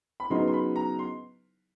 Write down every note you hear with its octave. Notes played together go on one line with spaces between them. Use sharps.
B5
C#3 F#3 B3 D#4 C6
C6
B5
A#5
C6